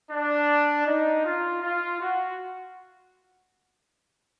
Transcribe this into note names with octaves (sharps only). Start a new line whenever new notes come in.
D4
D#4
F4
F4
F#4